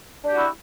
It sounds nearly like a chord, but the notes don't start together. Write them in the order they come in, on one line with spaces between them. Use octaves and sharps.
D4 G4 F#4 E4